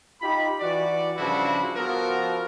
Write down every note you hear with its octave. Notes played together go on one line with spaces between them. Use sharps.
D#4 F4 G4 B5
E3 F#4 D5
G2 C#3 F3 D4 E4 F#4
F3 B3 F#4 A4 A#4